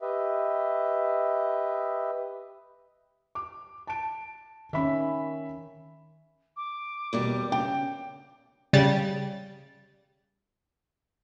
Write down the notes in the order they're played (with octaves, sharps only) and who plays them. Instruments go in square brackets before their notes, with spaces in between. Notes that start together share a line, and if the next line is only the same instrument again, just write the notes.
[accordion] G4 B4 D#5 E5
[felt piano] D6
A5 D7
[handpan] D#3 C#4 [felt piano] E5 B5
[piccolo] D6
[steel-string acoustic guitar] D#2 B2 G3
[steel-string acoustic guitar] C#3 [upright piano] G5
[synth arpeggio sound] C#3 G3 A6